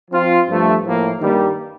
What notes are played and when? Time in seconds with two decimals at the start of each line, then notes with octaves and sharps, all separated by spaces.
0.11 F3 C4 F4
0.48 G2 F3 A3
0.83 A2 F3 A#3
1.20 G2 D#3 G3 A#3